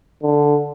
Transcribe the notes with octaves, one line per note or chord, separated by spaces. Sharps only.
D3